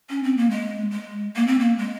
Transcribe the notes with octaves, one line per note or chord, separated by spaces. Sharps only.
C#4
C4
A#3
G#3
G#3
A#3
C4
A#3
G#3